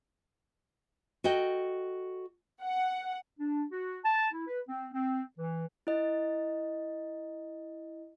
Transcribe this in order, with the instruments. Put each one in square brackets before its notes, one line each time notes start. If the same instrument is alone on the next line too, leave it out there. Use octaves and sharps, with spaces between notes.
[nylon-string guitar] F#4 A4 D#5 G5
[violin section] F#5
[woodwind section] D4
F#4
A5
E4
B4
C4
C4
E3
[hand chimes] E4 D#5